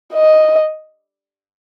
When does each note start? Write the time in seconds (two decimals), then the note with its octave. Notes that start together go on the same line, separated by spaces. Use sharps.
0.13 D#5